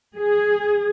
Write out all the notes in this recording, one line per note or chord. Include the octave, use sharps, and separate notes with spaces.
G#4